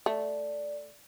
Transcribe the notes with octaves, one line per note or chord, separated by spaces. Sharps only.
A3 D5